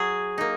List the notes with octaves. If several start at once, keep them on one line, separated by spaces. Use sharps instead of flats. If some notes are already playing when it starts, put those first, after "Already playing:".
Already playing: F#3 G#4
A#3 D#4